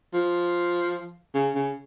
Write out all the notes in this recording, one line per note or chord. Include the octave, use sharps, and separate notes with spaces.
F3
C#3
C#3